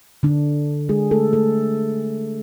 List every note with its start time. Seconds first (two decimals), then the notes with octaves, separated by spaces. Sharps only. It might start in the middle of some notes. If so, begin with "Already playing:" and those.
0.23 D3 D4
0.89 G#3 G#4
1.11 A3 A4
1.33 A3 A4